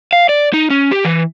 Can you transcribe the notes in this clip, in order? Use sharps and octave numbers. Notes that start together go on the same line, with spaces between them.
F5
D5
D#4
C#4
G4
E3